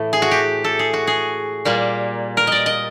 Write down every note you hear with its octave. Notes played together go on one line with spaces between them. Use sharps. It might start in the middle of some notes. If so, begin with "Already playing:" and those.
Already playing: A2 E3 A3
G#4
F#4
G4
A4
G#4
F#4
G#4
A#2 G3 A#3
A#4
D5 D#5
D#5